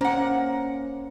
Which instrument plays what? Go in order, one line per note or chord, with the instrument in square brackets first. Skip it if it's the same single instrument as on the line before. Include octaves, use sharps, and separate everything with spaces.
[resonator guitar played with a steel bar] A#3 F#5 [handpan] C#4 C5